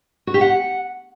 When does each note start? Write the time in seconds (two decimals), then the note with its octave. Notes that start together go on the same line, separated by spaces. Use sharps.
0.27 F#4
0.34 G4
0.41 F#5